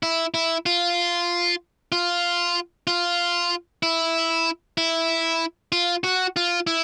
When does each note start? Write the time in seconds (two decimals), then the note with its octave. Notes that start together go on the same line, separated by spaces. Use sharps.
0.03 E4
0.34 E4
0.66 F4
1.92 F4
2.87 F4
3.83 E4
4.78 E4
5.72 F4
6.04 F#4
6.36 F4
6.67 E4